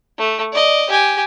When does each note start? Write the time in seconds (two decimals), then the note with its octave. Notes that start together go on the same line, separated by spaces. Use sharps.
0.19 A3
0.53 D5 D#5
0.90 G4 G#5